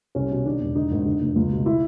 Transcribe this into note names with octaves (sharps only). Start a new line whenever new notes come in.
C2 C#4
B2
D#3 D4
E1
D3 D#4
G#1
D3
F1
C#2
B2
E4